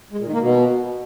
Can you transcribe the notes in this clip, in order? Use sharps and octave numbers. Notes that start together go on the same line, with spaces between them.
G#3
A#2
D#3
A#3
B2